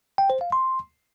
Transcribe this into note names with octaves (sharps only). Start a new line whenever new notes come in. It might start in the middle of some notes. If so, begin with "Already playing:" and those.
G5
C5
F5
C6